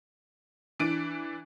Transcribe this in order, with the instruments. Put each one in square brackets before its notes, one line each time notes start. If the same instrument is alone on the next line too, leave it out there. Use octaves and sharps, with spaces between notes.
[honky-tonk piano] E3 D4 D7